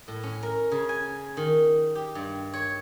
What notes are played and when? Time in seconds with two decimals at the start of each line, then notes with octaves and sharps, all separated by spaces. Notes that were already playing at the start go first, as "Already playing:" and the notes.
0.08 A2
0.23 C#4
0.43 A#4
0.72 C#3
0.89 G#5
1.37 D#3
1.95 G4
2.15 G2
2.53 C#5